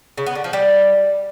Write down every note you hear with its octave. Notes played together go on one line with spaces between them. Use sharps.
C#3
B3
D3
F3
G3